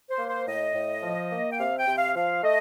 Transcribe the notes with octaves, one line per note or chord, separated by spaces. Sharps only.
C5
A#3
C5
A2 D#5
A2
F3
A#3
G5
C3 F5
G5
C3
F5
F3 F5
A3 D#5